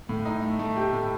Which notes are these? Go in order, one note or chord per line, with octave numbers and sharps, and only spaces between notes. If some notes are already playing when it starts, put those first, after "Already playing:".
A2
D#4
A3
A3
G4
A2